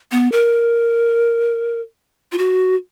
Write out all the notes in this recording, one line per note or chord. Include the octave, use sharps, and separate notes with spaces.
B3
A#4
F4
F#4